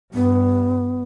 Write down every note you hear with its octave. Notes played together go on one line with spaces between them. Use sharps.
G2 B3